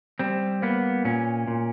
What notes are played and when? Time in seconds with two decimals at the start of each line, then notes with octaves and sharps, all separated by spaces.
0.19 G3 C4
0.62 A#3 B3
1.05 A#2 C#4
1.48 A#2